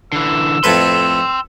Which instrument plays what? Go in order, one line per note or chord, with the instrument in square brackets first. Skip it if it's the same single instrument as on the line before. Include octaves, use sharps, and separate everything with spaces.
[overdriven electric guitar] D3 E3 [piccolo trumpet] E6
[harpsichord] F2 A2 B4 [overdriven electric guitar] G5 C6